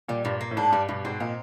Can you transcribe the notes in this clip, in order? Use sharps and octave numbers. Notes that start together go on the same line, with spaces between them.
A#2 G3
G2 A#2
A#3
A2
G#2 D4
G2 G3
G2 B2
G#2 C4
A#2 D#4